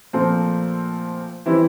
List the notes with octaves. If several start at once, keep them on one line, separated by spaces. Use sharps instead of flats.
A#2 F3 A3 C4
E3 G3 C4 E4